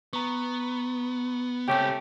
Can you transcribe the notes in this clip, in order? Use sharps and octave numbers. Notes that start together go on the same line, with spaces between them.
B3 A#5 C#6
C#2 A3 C4 C#4 G4 G5 D6 D7